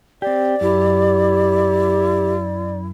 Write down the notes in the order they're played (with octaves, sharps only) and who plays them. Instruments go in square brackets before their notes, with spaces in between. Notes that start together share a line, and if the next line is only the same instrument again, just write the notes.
[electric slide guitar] C4 G4 [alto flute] D5
[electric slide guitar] F#2 [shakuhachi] E4 [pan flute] G4